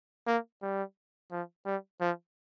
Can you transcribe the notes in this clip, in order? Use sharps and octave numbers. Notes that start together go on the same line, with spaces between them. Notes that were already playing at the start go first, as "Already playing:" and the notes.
A#3
G3
F3
G3
F3